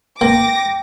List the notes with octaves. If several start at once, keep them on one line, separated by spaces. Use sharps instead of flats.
A#3 G5 D6 A#6